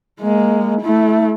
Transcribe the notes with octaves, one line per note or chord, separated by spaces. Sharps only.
G#3 A#3
A3 E4